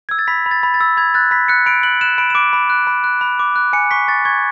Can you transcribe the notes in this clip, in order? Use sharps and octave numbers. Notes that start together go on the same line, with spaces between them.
E6 G#6
A6
B5 B6
B5
A6
B5
A6
E6
B5 G#6
F#6 A6
B5 B6
F#6 C#7
B5 D7
F#6 F#7
F#6 E7
B5 D7
E7
D6 D7
B5
F#6
B5
F#6
B5
D6
F#6
G#5 C#7
C#6 B6
C#6 A6
C#6 G#6